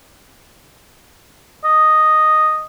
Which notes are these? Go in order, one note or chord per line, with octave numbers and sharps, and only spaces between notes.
D#5